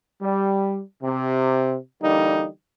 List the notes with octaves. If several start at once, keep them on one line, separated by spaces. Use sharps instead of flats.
G3
C3
D3 E3 G3 A#3 D#4